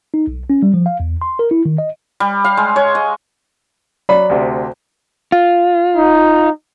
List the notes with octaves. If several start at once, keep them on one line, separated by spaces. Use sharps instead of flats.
D#4
B1
C#4
G3
F3
F5
E2
C6
A#4
E4
D#3
D#5
G3
F5
G#3
C#5
D#5
F#3 D5 B5
D2 C3
F4
D#4